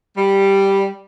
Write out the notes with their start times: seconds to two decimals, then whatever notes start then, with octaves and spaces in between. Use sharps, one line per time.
0.17 G3